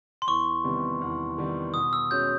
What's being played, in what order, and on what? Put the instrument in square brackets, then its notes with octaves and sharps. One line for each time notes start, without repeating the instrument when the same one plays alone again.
[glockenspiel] C6
[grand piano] E2 [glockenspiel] C#6
[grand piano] C3 D#3 G3 B3
E2
C3 D#3 G3 B3
[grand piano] B2 [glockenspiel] D#6
[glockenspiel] E6
[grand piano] G#3 C#4 F#4 [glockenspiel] G6